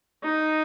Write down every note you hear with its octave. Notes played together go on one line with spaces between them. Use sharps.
D#4